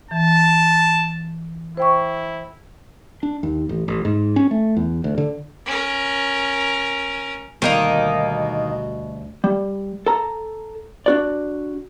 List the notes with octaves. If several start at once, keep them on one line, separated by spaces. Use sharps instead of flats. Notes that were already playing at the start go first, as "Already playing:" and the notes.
E3 A5
E4 C5 G5 C#6
D4
D#2
A1
A1
G#2
C#4
A3
E2
D2
D3
C#4 A#4
D2 B2 D#3 G3 A#3 D#4
G3
A4 A#5
D4 F#4 D5